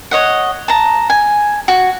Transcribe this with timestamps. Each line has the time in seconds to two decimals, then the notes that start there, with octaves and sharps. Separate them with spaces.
0.11 C#5 D#5 F#5
0.68 A5 A#5
1.10 G#5
1.68 F#4